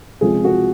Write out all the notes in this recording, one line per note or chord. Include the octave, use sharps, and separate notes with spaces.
C#2 C3 F3 G#3 G#4
F#4